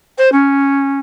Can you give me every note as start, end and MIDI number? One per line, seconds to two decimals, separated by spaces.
0.17 0.29 72
0.32 0.99 61